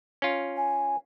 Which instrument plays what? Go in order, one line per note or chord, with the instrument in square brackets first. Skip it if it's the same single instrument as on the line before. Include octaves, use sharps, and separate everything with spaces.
[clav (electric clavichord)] C#4 F4
[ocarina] G#5